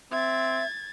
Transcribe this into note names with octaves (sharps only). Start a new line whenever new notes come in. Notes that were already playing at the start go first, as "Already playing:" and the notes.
C4 E5 G#6 A6